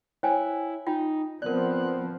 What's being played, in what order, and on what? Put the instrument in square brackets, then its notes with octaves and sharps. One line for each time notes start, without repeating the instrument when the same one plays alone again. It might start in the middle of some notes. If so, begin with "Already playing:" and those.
[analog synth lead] E4 [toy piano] C5 G5 G#5 [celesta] C#5
[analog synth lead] D#4 [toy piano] F4 [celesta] G5
[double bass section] F3 B3 C4 [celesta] A#4 D5 [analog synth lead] F#6